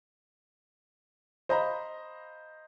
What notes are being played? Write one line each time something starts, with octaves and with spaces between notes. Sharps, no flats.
C5 D#5 F5 A#5 B5